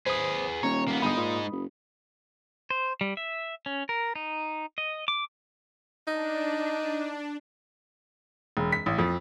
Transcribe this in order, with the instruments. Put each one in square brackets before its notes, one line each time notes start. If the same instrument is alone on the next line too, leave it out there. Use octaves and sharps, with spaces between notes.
[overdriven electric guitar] G#4 B4 [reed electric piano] C5 D#6
[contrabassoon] D#1 [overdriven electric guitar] C#5 [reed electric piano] A#5
[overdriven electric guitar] A#3 B3
[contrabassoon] G1 [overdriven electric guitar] G#3 D#4 [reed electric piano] B5 D#6
[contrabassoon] A#2
F#1
[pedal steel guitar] C5
G3
E5
C#4
A#4
D#4
D#5
D6
[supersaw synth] D4 [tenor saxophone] D#4
[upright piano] E1
B6
A1
F2